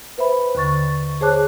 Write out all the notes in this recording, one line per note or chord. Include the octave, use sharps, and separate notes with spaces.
B4 C5 E5 B5
D#2 D3 C#6 A6
G#4 C5 C#5 A5 D6 F#6